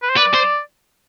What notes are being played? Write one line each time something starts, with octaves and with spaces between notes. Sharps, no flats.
B4
C5
B4 D5
C5